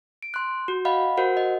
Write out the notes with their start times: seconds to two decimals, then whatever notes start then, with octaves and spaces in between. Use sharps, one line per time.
0.23 D7
0.34 C6 F#6
0.68 F#4
0.85 D#5 F5 F#5 B5
1.18 F#4 A#4 C5 F#5
1.37 D#5